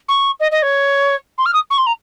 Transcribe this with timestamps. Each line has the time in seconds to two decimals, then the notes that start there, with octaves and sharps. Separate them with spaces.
0.09 C#6
0.40 D#5
0.52 D#5
0.63 C#5
1.38 C6
1.46 F6
1.54 D#6
1.71 C#6
1.78 C6
1.87 A#5